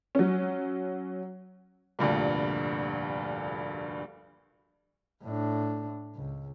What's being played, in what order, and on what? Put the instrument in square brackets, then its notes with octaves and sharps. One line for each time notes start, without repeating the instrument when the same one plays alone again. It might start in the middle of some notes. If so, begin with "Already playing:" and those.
[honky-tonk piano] F#3 C#4
[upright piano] F1 D2 G2 A#2
[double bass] A2 D4
C#2